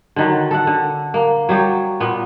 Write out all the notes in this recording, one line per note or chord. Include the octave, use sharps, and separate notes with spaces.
D3 D#3 F#3
A4 F#5
D3
A#3
F#3 G3 G4 C#5
A#2 B3